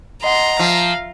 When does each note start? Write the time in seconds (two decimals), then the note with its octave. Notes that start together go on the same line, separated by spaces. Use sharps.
0.24 D#5 F#5 A#5 C6
0.59 F3 E5 F5 A#6